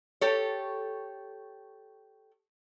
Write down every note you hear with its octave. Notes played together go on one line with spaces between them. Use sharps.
G4 A4 C#5